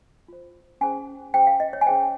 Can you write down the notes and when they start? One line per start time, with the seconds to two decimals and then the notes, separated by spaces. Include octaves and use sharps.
0.28 F4 C5
0.81 C#4 G#4 C5 G#5
1.34 C#4 G#4 C5 G5
1.47 F5
1.60 D#5
1.73 C#5
1.81 G#5
1.86 C#4 G#4 C5 G5